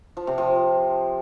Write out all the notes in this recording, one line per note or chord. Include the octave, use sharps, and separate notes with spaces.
F3
C3
F3